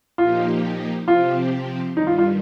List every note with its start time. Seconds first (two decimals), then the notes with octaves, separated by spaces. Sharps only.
0.18 A#2 F3 A#3 D#4 F4 G4
1.08 C3 F3 C4 F4 G4
1.96 G2 D#3 G3 D#4
2.07 F4
2.18 F4